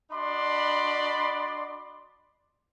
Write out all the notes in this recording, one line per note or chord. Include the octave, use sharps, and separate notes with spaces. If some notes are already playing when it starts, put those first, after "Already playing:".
D4 F#4 D5 D#5 B5 C6